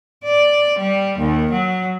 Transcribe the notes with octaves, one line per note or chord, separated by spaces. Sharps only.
D5
G3
D#2
F#3